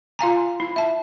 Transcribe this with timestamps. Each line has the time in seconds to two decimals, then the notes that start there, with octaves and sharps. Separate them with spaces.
0.19 F4 F5 G#5 A#5
0.60 E4
0.76 E5 A5